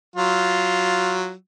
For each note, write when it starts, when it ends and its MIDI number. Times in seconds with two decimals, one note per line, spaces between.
0.16 1.32 54
0.16 1.32 65